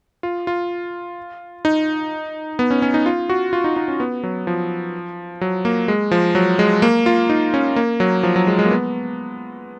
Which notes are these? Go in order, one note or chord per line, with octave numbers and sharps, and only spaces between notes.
F4
F4
D#4
B3
C#4
C#4
D#4
F4
F#4
F4
D#4
D#4
C#4
B3
F#3
F3
F#3
A#3
G#3
F3
F#3
G#3
A#3
F4
D#4
C#4
A#3
F#3
F3
F#3
G#3
G#3
A#3
B3